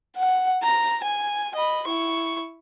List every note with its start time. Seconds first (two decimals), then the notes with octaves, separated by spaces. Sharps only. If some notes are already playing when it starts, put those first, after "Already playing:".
0.16 F#5
0.63 A#5
1.03 G#5
1.55 D#5 B5
1.87 E4 C#6